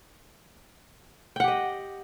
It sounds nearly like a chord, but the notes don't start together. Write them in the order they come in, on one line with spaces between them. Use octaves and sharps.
G5 F#5 G4 D#5